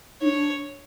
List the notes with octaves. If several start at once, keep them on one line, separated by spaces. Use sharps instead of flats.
D4 D#4 C#5